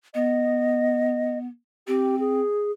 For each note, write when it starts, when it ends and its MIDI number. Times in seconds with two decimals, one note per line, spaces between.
0.15 1.46 59
0.15 1.38 75
1.87 2.41 60
1.87 2.19 67
2.19 2.72 68